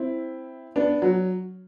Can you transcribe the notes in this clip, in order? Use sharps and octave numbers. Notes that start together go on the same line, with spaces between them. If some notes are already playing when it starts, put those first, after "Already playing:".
Already playing: C4 E4
B3 D4
F#3